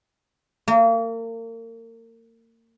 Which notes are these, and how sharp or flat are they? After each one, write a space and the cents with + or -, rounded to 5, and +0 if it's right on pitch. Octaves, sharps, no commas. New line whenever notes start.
A#3 -35